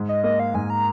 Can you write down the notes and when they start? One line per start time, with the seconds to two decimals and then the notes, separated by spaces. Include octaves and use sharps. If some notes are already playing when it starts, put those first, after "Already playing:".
Already playing: G#2
0.09 D#5
0.23 A#3 D#5
0.40 F5
0.54 G#2 G#5
0.70 A#5